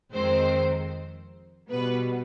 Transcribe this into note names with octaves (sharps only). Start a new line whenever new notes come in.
F2 D#3 G#3 C4 C5
B2 G3 B3 B4